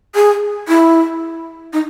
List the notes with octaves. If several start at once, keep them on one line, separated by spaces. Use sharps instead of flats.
G#4
E4
D#4